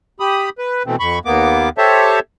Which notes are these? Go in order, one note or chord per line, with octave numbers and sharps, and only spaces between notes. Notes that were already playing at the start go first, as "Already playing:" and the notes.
G4 B5 D#6
B4
B2 E3 A3 C4
F2 B5 C#6
D#2 A#3 B3 D6
G4 A4 C5 C#5 E5 A5